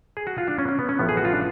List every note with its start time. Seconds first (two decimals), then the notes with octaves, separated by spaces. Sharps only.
0.17 G#4
0.27 F#4
0.38 F4
0.48 D4
0.59 C#4
0.69 C#4
0.79 B3
0.89 C#4
0.99 A1 A2 F3 B3
1.09 G#4
1.17 F#4
1.25 F4
1.33 D4